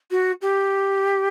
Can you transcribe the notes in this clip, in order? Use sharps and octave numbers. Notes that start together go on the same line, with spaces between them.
F#4
G4